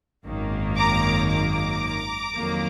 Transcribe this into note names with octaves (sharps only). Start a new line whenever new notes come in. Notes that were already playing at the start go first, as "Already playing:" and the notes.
G#1 F#2 D#3 A#3
A#5 D6
A#5 D6
F2 D#3 F#3 A#3